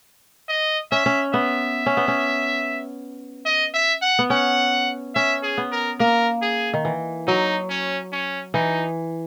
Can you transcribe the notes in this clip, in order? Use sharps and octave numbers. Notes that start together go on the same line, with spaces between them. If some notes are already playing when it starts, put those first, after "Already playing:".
D#5
C#4 E5
C#4
B3 E5
C#4
B3
C#4
D#5
E5
F#5
B3
C#4 F#5
C#4 E5
G#4
B3
A#4
A#3 A#4
G#4
D#3
E3
F#3 D#4
C#4
C#4
E3 D#4